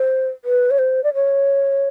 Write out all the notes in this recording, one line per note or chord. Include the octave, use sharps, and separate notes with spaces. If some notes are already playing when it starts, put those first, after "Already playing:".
Already playing: C5
B4
C#5
C5
D5
C#5